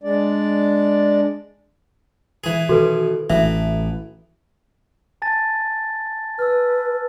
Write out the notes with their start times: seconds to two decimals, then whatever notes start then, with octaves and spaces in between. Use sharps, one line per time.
0.03 G#3 D4 D5
2.44 E3 G#4
2.69 B2 D#3 F#4 A4 B4
3.30 A1 A2 E3 E5
5.22 G#5 A5 A6
6.39 B4 E6 F6